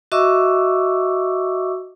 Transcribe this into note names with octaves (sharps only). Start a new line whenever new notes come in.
F#4 D#5 E5 C#6 D6 E6